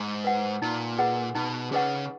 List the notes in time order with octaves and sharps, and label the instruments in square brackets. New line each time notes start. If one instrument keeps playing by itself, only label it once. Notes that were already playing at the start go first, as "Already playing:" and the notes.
Already playing: [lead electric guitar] G#2
[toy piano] B4 F#5
[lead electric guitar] A#2 [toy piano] D#4
[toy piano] G#4 B4 D#5 F#5
[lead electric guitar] B2 [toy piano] D#4
[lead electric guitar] C#3 [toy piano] G#4 B4 D#5 F#5